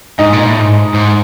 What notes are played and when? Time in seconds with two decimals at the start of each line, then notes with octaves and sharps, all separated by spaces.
0.19 G#2 D#4
0.33 A#2
0.47 A2
0.61 G#2
0.94 G#2